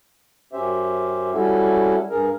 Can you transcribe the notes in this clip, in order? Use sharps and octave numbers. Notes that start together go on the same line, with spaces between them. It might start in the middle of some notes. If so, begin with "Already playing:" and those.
F#2 C#4 G4 C5 E5
G3 C#4 E4 F#4 A4
G2 G#4 A#4